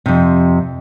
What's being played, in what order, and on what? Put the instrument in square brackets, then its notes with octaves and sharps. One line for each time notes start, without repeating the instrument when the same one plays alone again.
[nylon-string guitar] F2 C3